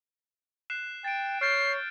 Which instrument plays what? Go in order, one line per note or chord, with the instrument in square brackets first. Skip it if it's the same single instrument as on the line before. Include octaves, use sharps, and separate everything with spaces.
[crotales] F#6 C7 E7
[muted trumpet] G5 [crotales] A6 D7
[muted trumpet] C#5 [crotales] F6 G6 A6 [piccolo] C7